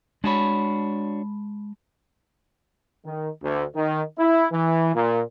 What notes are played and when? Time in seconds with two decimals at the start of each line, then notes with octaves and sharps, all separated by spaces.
0.24 G#3 D4 F#4 C#5 A5 B5
3.05 D#3
3.43 D2
3.75 D#3
4.18 E4
4.52 E3
4.94 A#2